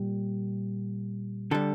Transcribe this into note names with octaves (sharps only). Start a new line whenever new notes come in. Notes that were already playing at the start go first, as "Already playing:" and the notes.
Already playing: A#2 G3
D3 G3 A4